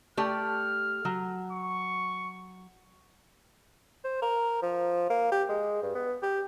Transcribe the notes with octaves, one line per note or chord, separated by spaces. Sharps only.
A3 G4 D5 F6
F#3
C#6
C5
A#4
F3
A#3
G4
G#3
G2
B3
G4